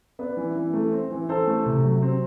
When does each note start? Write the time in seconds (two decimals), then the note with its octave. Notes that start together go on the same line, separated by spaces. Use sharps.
0.19 B3 B4 D5
0.37 E3
0.55 E3
0.73 A3
0.92 C4
1.10 E3
1.29 E3 A4 C5
1.47 A3
1.66 C3
1.84 F#3
2.02 C4